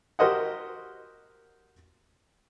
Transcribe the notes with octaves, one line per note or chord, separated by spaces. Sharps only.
F#4 G4 A#4 C5 D#5 F#5